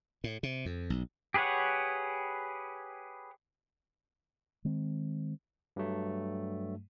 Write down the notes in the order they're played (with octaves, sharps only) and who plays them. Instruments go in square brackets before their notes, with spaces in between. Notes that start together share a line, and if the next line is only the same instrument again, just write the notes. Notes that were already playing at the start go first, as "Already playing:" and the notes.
[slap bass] A2
C3
F2
B1
[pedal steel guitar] G4 G#4 B4 C#5 F#5
[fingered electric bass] D#3 G#3 C4
[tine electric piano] G2 F#3 A3